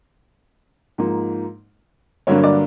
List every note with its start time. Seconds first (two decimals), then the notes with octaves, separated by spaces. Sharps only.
0.98 G#2 F3 A#3 D#4
2.27 G2 D3 F#3 A#3 D4 C#5
2.44 D5